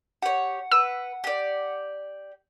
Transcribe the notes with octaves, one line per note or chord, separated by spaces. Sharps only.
G4 C#5 F#5
B4 E6
G4 D5